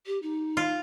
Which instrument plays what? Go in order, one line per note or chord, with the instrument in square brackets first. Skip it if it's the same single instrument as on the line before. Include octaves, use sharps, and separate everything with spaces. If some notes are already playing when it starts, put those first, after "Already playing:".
[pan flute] G4
D#4
[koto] F4